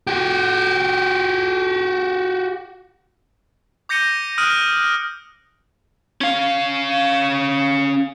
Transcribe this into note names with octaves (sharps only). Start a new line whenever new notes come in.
F#4 G4
D6 G6 A#6 C#7 D#7 G7
D#6 F6 F#6 A#6 D7 D#7
C#4 F5